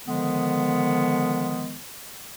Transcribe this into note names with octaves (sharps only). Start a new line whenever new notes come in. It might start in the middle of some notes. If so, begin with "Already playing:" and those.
D3 D#3 F3 G#3 B3